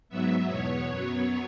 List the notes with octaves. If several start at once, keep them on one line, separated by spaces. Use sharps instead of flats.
G#2 F#3 B3 E5
E2 B2 B3 C#5
F#2 F#3 B3 C#5